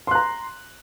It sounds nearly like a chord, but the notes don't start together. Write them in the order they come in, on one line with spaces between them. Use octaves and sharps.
C6 F#6 A#5